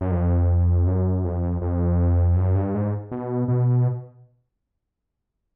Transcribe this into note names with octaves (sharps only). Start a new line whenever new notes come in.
F#2
F2
F#2
F2
F2
F#2
G2
G#2
B2
B2